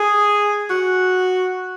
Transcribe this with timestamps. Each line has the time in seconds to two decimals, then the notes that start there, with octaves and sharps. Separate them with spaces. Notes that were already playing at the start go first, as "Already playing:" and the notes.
Already playing: G#4
0.70 F#4